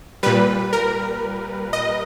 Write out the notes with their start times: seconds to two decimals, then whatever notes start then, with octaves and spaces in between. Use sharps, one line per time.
0.23 A#2 G3 B4
0.73 A#4
1.73 D#5